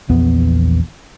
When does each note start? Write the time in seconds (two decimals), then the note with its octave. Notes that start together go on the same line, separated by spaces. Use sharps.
0.09 A#1 E2 B3